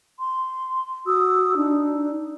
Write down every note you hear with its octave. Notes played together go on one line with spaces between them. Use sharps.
C6
F#4 D#6 E6
D4 D#4